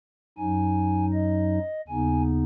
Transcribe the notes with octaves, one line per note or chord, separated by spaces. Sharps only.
F#2 F#3 D#4 G#5
D#5
D#2 C#3 B3 D#4 G#5